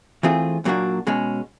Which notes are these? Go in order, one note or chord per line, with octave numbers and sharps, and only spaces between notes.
E3 A3 C4 F4 G#4
A#2 F#3 A#3 D4 F#4
B2 G#3 C#4